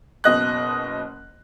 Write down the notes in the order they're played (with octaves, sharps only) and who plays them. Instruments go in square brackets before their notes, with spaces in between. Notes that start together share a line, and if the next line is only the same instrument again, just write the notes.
[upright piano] F#1 B2 D#5 F#6